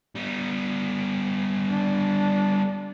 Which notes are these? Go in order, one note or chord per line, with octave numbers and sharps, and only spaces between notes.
G3 B3
D4